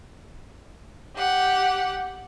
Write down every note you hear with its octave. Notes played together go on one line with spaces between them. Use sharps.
G4 F#5